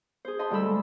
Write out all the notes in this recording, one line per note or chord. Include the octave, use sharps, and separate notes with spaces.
G#4 C5
B4 D#5 A5 C6
D2 G3 G4 A4 B5 E6
G#3